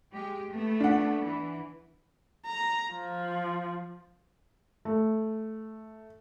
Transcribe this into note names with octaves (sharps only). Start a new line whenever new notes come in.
G#3 G4
A3 B3
D4 F#5
E3
A#5
F3
A3